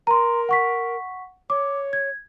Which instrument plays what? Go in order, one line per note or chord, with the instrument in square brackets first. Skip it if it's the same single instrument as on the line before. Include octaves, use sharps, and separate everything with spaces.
[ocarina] A#4 [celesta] A#5 C6
[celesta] F#5 C#6 B6
[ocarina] C#5 [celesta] D6
[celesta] G#6